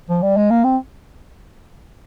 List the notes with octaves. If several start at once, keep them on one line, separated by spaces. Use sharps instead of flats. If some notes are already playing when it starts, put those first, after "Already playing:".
F3
G3
G#3
A#3
C4